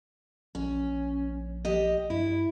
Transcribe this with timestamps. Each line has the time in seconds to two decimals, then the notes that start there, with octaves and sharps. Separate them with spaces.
0.55 A#1 C#4
1.65 G4 D#5
2.10 G2 E4